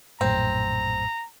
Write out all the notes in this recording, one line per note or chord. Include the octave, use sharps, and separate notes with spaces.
A#1 F#2 A2 C4 A#5